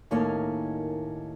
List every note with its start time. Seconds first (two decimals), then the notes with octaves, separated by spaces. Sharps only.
0.11 D#2 A2 D#3 A#3 C#4